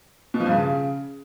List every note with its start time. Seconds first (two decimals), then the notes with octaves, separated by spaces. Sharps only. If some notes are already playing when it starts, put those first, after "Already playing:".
0.34 B2
0.40 F3
0.46 G2
0.51 C#3